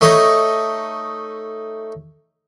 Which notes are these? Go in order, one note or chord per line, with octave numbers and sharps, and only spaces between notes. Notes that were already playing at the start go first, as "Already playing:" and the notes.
A3 D#4 C#5 D#5